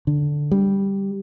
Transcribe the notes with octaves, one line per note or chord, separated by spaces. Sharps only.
D3
G3